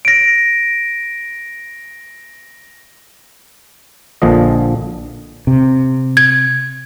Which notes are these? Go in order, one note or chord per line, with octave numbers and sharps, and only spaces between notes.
A#6 D7
A#1 A#2 D3 F3 D#5
C3
G#6